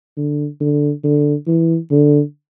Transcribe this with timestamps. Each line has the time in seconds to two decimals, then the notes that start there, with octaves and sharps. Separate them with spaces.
0.17 D3
0.60 D3
1.04 D3
1.47 E3
1.91 D3